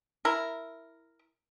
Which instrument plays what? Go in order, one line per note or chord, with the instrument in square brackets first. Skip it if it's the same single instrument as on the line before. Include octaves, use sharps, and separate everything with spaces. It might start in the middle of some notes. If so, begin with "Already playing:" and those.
[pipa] E4 A#4